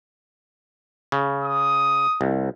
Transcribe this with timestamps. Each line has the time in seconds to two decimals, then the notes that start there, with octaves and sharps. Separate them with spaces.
1.12 C#3
1.44 D#6
2.21 C2